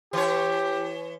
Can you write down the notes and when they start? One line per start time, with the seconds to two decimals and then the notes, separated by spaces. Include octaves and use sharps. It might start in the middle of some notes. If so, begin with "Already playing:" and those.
0.13 E3 G4 C#5